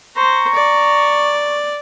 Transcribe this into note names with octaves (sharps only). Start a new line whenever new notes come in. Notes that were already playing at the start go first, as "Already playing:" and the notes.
C5 A#5 C#6
D5